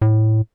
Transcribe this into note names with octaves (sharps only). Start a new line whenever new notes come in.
A2